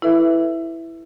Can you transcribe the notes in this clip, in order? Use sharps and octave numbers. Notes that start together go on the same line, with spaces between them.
E4 A4 B4 E5